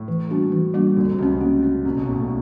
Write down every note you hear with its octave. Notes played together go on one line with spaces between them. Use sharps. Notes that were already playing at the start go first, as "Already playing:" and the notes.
Already playing: A2
E3
G3 A#3 D4 F#4
E3
G3 A#3 D4 F#4
D2 D3 A#3
C3
C#2 C#3 C#4 F#4
A#3
C#4 F#4
C2 C3 A#3
B1 B2
A2 C#4 F#4
A#2